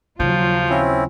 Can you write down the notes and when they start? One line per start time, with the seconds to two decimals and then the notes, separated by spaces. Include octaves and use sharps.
0.20 D#2 C#3 F3 F#3 F4
0.69 C4 C#4 E4